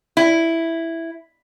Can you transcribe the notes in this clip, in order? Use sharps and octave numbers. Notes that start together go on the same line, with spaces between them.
E4